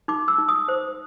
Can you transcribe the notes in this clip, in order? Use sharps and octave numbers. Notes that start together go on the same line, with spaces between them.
D#4 D6
E6
D#4
D#6
C5